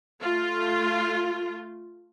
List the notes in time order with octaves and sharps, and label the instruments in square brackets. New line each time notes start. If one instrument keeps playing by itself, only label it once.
[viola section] A3 F4